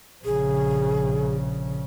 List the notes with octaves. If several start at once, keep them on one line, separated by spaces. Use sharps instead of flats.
A#1 C#3 G#4